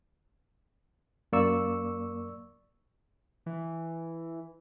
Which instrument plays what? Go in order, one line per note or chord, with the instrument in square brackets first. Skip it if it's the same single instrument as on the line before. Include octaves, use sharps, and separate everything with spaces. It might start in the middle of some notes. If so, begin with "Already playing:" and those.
[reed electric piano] F#2 A#3 D5 C#6 E6
[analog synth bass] E3